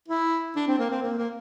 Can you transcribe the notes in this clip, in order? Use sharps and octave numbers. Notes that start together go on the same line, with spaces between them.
E4
D4
C4
A#3
C4
A#3
A#3